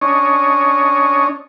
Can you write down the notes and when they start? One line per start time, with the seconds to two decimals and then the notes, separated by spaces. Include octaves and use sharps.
0.01 C#4 D4 C#5 D#5